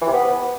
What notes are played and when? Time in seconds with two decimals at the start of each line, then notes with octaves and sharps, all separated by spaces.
0.02 E3
0.07 C3
0.13 B3